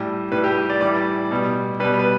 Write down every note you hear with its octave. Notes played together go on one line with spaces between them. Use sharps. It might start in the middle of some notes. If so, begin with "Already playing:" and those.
Already playing: A2 G3
A2 G3 B4
G4
G4
D5
A2 E3 G3 D5
B2 G3
B2 G3 B4
B4